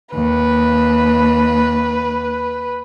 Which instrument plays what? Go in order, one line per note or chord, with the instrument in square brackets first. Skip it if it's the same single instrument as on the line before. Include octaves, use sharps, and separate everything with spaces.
[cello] D#2 [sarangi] B4